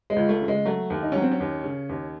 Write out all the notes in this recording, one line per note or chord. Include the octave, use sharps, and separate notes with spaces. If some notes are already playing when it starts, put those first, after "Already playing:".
G#3
C#2
A3
C#3
G#3
F#3 A3
D#2
D#4
F#3 C#4
C4
C#4
D#2
C#3
D#2